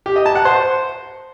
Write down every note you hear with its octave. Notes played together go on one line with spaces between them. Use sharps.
G4
D#5
A5
F#5
C5